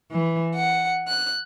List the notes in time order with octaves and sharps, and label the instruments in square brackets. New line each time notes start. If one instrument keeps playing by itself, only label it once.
[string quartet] E3
F#5
F#6